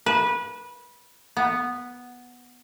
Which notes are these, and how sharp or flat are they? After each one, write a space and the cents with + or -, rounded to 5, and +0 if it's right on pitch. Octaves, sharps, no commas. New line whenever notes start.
B4 -20
B3 -5